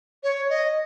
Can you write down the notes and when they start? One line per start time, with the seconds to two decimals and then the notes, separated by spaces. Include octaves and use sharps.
0.23 C#5
0.50 D#5